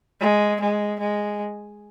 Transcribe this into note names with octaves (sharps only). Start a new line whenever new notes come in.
G#3
G#3
G#3